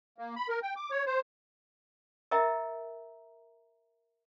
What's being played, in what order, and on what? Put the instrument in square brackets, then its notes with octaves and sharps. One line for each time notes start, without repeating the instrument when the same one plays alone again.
[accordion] A#3
B5
A#4
G5
D6
C#5
C5
[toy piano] A#4 D#5 E5 G5 A#5